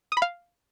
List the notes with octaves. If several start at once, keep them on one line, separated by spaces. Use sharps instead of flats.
D#6
B5
F5